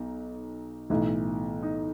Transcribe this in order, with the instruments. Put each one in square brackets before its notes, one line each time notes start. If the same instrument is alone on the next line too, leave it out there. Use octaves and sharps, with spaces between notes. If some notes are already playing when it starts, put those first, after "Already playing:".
Already playing: [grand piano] B1 B2 D#4
B1 A2 E3
D#4